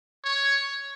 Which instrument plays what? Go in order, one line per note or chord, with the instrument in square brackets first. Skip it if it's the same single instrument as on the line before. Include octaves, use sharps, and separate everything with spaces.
[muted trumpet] C#5